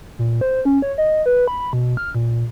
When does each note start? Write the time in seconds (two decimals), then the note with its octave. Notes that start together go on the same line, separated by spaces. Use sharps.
0.19 A#2
0.41 C5
0.65 C#4
0.82 C#5
0.98 D#5
1.26 B4
1.48 B5
1.73 B2
1.97 F6
2.15 A#2